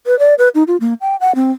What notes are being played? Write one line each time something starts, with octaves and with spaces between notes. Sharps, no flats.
B4
D5
B4
D#4
F4
A#3
G5
F#5
C4